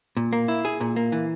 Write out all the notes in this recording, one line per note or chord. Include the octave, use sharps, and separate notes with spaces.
A#2
A#3
E4
G#4
A#2
A#3
E3